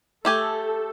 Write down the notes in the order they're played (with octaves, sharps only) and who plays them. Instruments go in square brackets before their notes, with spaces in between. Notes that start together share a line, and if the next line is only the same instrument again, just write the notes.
[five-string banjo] A3 G4 G#5 [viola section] A4